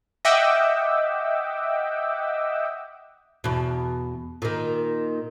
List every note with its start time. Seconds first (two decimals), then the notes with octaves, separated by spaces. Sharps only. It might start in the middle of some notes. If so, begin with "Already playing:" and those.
0.25 D#5 E5 F#5 G5 D6 E6
3.44 E2 B2
4.42 A#2 D#3